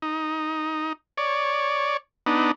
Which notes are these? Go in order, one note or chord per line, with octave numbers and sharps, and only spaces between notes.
D#4
C#5 D5
B3 D4 D#4